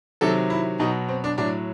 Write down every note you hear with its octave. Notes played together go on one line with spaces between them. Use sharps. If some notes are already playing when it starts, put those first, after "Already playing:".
C3 D#3 F#3 A4
E4
B2 F#3 D#4
C4
D4
A2 F#3 D4